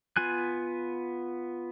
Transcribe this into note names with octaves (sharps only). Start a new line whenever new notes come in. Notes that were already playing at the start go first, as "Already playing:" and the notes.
B3 F4 G#5 F#6